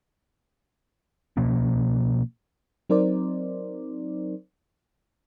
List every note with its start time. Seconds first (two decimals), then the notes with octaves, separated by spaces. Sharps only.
1.37 B2 F3 A#3 C#4
2.89 F#3 C4 D#4 A#4 C5 D5